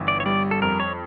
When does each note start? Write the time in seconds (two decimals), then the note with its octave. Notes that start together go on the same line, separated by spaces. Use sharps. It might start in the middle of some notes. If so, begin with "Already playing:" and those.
Already playing: G1 E3
0.08 D5
0.20 C#5
0.26 G3 D5
0.51 A4
0.62 F2 A#4
0.80 C#5